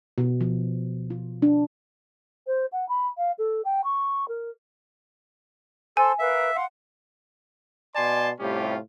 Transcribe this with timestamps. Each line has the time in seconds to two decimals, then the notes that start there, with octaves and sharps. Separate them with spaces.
0.18 B2
0.41 F3
1.10 F4
1.42 D4
2.47 C5
2.72 F#5
2.88 B5
3.17 F5
3.38 A4
3.64 G5
3.84 C#6
4.28 A#4
5.97 A4 C5 G#5 A5 C6
6.19 A#4 B4 E5 F5
6.54 F5 F#5 C6
7.95 B2 D5 G#5 A5 C6
8.40 A2 C3 G3 C#4 F4 G4